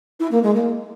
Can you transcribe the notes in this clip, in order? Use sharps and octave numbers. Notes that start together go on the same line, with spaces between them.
E4
A#3
G#3
A#3